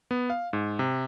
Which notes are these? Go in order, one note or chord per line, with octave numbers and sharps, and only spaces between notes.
B3
F5
G#2
C3